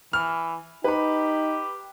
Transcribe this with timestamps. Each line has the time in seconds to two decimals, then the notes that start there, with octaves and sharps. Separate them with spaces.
0.13 E3 F6
0.84 D#4 G4 B4 B5